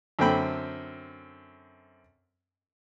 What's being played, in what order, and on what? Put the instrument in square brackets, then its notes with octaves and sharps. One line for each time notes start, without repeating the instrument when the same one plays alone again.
[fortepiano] F#2 D3 C4 G5 B5